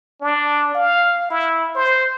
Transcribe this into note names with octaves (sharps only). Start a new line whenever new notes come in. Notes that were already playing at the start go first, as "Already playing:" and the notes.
D4
F5
E4
C5